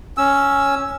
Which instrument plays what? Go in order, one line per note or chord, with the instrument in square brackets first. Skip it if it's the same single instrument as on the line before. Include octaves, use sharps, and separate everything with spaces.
[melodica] C#4 E6